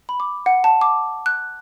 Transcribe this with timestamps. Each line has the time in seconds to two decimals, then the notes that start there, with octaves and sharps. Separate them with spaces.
0.09 B5
0.20 D6
0.46 F#5
0.64 A5
0.81 D6
1.26 F#6